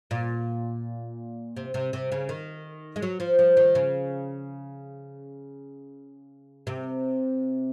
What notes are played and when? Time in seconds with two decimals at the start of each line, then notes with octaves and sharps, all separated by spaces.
0.11 A#2
1.56 C3
1.74 C3
1.93 C3
2.12 C#3
2.29 D#3
2.96 G#3
3.02 F#3
3.20 F3
3.39 F3
3.57 D#3
3.75 C#3
6.67 C3